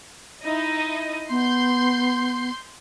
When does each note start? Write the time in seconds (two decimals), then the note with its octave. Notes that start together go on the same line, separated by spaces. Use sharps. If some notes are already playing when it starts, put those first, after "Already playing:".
0.43 D#4 E4 D#5
1.30 B3 C6 G6 C7